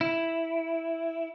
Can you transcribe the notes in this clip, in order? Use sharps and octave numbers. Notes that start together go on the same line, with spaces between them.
E4